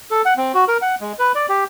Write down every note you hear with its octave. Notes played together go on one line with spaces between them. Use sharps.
A4
F#5
C4
F#4
A#4
F#5
G#3
B4
D5
G4